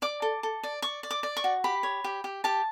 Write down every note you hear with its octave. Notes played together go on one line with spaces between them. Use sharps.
D5 D6
A4
A4
D5
D5 C#6
D5
D6
D5
C#6
F#4
G4 B5
C#5
G4
G4
G4 A5